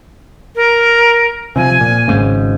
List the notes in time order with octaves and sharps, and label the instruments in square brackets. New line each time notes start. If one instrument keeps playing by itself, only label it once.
[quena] A#4
[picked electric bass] C3 D#3 F3 [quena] G#5
[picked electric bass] A#2
G#1 G#2 C#3